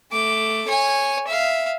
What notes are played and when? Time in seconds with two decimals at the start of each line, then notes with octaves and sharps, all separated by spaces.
0.11 A3 D6
0.67 C#5 G#5
1.27 E5 F5